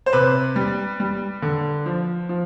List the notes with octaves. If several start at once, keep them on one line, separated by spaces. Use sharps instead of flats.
C5
C3 B4
G3
G3
D3
F3
F3